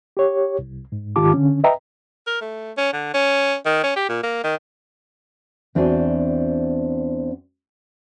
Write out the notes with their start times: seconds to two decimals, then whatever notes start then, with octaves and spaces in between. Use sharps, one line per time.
0.17 G4 C#5
0.59 C2
0.92 G#2
1.16 G#2 D#3 F4 G4 A5 D6
1.34 D3 C#4
1.64 B4 D#5 E5 G5 A#5
2.27 A#4
2.41 A3
2.77 C#4
2.93 D3
3.14 C#4
3.65 D#3
3.83 C#4
3.96 G4
4.09 A#2
4.23 A#3
4.44 D#3
5.75 E2 C4 D4 F#4 C5 G#5